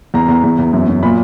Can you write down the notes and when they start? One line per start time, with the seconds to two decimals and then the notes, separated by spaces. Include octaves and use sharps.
0.14 E2 A#5
0.28 E2
0.44 E2
0.59 E2
0.73 F#2
0.88 F#2
1.03 A#2 B5